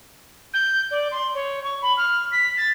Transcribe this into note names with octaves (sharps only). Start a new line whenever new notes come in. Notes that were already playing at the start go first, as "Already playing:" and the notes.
G6
D5
C6
C#5
C#6
B5
F6
B6
A6